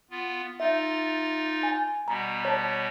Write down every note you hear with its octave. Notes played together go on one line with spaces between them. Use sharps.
B3 F4
D#4 F4 E5 A6
G#5
B2 G3 B3 A#5
C#5 A5